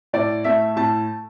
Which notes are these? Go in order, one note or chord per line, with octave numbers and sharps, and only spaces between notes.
A2 D5
A3 E5
A2 A5